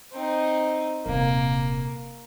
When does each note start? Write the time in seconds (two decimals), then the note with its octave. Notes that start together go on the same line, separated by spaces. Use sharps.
0.13 C4 D#4
1.06 D#1 C3 A#3